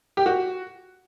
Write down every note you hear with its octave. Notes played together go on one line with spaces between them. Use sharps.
G4
F#4